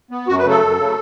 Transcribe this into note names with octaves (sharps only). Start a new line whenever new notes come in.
B3
F#2 F#4
B4
C#3 F#3 A3
A4
F#2
C#3 F#3 A3